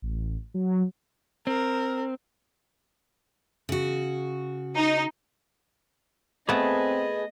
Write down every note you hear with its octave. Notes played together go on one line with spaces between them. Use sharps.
A1
F#3
C4 A#4
C#3 F#4
D#4
A3 B3 C4 G#4 B4 D#5 A5